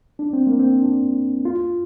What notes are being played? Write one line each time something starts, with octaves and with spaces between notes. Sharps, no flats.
D4
C4
A#3
C4
D4
F4